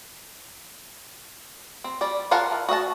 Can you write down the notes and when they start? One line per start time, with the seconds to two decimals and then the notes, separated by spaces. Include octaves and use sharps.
1.84 C4
2.01 G3 D5
2.31 F4 A#4 F5 F#5 A5
2.52 E3
2.69 F#4 D#5 E5 A5